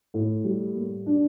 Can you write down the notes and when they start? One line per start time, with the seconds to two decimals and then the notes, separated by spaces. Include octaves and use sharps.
0.14 A2
0.44 G3
0.74 A#3
1.06 D4